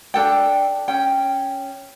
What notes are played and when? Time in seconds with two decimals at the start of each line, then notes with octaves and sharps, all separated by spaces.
0.14 D4 A4 G5
0.88 C#4 G5